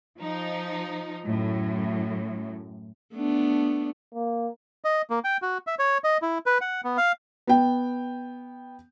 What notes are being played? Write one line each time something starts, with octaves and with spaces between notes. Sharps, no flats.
F3 D#4
F#2 A2
A3 B3 D4
A#3
D#5
A#3
G5
F#4
E5
C#5
D#5
E4
B4
F#5
B3
F5
B3 G5